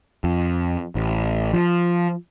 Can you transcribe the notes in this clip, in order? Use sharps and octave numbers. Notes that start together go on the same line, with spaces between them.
F2
A1
F3